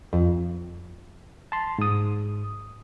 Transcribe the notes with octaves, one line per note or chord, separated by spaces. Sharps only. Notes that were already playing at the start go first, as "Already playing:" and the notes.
F2
A5 C6
G#2 D#6